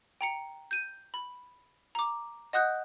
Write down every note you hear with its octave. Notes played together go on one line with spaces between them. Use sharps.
G5 A#5 C#7
G6 D#7
B5
A#5 D6
D#5 F#5 D#6 F#6 G6